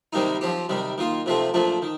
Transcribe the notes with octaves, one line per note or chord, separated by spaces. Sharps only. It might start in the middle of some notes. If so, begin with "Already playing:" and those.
C3 D#3 G3 A#3 D#4
F3 C4 G4
C3 D#3 G3
D#3 A#3 F4
C3 F3 A3 C4
A#2 F3 A3 D4
D#3